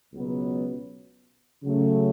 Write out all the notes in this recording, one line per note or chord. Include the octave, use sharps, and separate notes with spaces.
C#2 B2 F#3 B3
C#3 F#3 A3